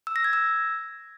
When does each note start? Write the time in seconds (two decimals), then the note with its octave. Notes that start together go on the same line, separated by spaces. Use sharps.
0.07 E6
0.16 A#6
0.24 G#6
0.33 E6